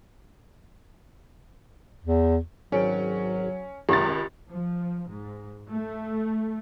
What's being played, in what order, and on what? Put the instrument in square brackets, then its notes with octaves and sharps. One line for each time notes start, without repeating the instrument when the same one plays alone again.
[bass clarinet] E2
[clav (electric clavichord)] G#1 D5 G5 [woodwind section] F#3 [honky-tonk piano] C#4
[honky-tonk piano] G#1 C#2 A6 [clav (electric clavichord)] F#2 C3 G#3 [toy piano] G4
[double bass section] F3
G#2
A3